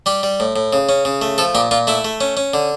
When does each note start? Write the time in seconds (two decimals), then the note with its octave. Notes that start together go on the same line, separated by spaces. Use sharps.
0.06 G3 G4
0.23 G3
0.40 A2
0.56 A2
0.73 C#3
0.89 C#4
1.05 C#3
1.22 A3
1.38 F3 A4
1.55 A#2 G4
1.71 A#2 F4
1.87 A3 E4
2.05 A3
2.21 C#4
2.37 C#4
2.54 D3